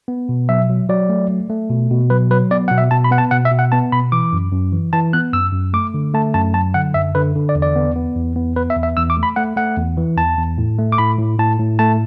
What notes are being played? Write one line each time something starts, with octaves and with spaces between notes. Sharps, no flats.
B3
B2
F#3 E5
F#3
F#3 D5
A3
A3
A3
B2
B2
F#3 B4
F#3 B4
B3 D5
B2 F#5
E5
B2 A5
B5
B3 F#5
A5
B2 F#5
E5
B2
F#5
B3 A5
B2 B5
E3 D6
F#2
F#2
E3
E3 A5
B3 F#6
F#2 E6
F#2
A3 D6
D3
A3 A5
F#2 A5
F#3 A5
D3 F#5
F#2 E5
D3 B4
D3
D5
E2
D5
B3
B3
E2
B3
B3 B4
E5
E2
E5
E2 E6
D6
A3
B5
A3 F#5
A3 F#5
E2
E3
E2 A5
E2
A2
A3
D6
A2 B5
A2
A2 A5
A2
A3 A5